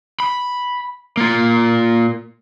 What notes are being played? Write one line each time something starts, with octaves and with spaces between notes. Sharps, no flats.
B5
A#3 F4